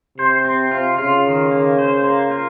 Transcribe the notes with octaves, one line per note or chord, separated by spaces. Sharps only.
C3 C5
C4
F4
C#3 F4
D#3
A#3
C5
A#3
F4